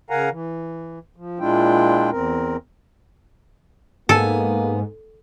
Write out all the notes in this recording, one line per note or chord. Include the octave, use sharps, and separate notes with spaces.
C#3 A#4 F5 F#5 G#5 A#5
E3
F3
A#2 G#3 D4 E4 F4 G5
E2 C4 A#4
G#2 A#3 B3 A4 G#5